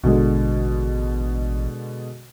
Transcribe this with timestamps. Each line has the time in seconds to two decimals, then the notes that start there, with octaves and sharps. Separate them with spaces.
0.04 A1 B2 D3 G#3